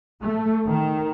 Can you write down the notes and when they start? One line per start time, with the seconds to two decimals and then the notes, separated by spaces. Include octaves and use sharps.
0.22 A3
0.67 D#3